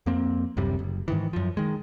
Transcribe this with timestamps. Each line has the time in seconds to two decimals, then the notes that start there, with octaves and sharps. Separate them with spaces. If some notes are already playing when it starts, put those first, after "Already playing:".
0.06 F2 A#3 C4
0.57 D1 F#2 C3 G3
0.79 F#1
1.08 G#2 D#3 E3
1.33 F#2 F3
1.57 D#3 G#3